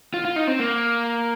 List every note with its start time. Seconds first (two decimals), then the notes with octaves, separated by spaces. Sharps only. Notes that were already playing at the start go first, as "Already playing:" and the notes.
0.14 F4
0.25 F4
0.36 D#4
0.48 C4
0.59 A#3